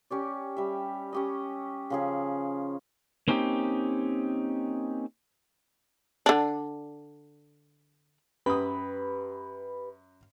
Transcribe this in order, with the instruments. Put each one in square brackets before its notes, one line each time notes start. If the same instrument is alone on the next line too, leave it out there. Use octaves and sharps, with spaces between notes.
[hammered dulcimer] C#4 G4 D5
G3 E5
C#4 G4 D#5
C#3 F3 G#4
[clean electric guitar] A#3 C4 C#4 D#4 G4
[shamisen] D3 D4
[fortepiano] F#2 D#6 [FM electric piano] G4 B4 B5